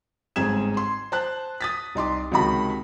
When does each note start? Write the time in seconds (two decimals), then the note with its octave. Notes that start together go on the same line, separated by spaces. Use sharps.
0.36 G1 G#2 C4 G#4 G#6 E7
0.77 C6
1.12 C5 A5 F#6
1.61 D#6 A6 B6
1.95 C2 D#4 C6 D6
2.32 C#2 C3 D#3 F#4 A5 B5